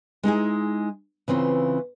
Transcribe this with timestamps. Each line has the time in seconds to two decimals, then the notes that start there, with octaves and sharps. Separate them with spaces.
0.23 G#3 D#4 E4 G#4
1.28 C#3 E3 C4 F4